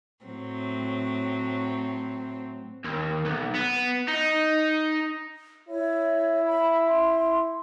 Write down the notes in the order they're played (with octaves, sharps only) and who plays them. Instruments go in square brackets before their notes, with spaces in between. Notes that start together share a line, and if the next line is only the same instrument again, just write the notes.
[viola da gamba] A2 F#3 C4
[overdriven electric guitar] D#2
B1
B3
D#4
[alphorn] E4 [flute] C#5
[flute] B5
C6